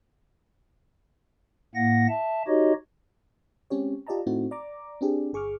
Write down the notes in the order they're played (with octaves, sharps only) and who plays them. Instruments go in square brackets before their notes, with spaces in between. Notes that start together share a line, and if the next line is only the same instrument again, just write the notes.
[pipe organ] A2 A#3 F#5 A#6
E5 A5
D#4 F#4 G4 C#5 D#5
[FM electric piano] G#3 C4 C#4 G4 C#5
F4 G4 D5 D#5 A5 A#5
A2 A3 C4 D#4 E4 F#4
D5 A#5 D6
C4 D4 G4 G#4
G1 G#4 C#6 D6 F6